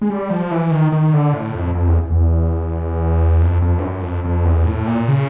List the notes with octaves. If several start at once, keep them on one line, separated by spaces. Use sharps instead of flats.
G#3
G3
F3
E3
D#3
D#3
D3
A2
F2
F2
E2
E2
F2
F2
G2
F#2
F2
F2
E2
A2
A#2
C#3